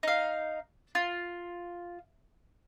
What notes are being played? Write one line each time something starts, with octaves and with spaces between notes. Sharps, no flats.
D#4 F5
F4